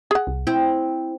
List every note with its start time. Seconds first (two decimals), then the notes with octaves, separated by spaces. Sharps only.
0.11 G#4 F#5
0.27 C2
0.47 C4 E4